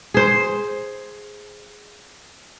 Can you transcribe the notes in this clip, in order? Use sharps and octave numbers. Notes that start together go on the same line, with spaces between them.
G#4 C5